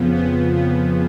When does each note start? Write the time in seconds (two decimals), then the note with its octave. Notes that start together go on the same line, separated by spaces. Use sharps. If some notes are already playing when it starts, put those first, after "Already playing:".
Already playing: F2 C#3 F3 B3
0.15 B3
0.56 B3